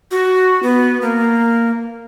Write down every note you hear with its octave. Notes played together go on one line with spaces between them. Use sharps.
F#4
B3
A#3